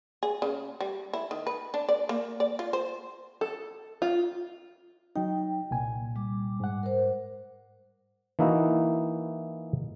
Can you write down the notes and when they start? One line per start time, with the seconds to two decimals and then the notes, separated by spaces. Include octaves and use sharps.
0.23 G#4
0.42 C#3
0.81 G3
1.13 E4
1.31 D#3
1.47 B4
1.74 D4
1.89 D5
2.09 A#3
2.40 D5
2.59 F4
2.73 C5
3.41 A4
4.02 F4
5.16 F#3 D#4 G5
5.71 C2 A#2 G#5
6.16 G3 D6
6.60 G#2 F#5
6.83 A#4 C5
8.39 E3 A#3 D#4 E4 F#4